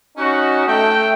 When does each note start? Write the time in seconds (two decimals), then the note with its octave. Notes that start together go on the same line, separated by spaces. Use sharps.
0.17 C#4 D#4 F#4
0.68 A3 G5